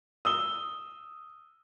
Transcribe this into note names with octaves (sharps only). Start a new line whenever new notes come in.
D#6 E6 G7